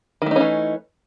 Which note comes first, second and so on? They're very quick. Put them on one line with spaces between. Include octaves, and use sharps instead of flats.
D#3 A3 D#4 C#4 E3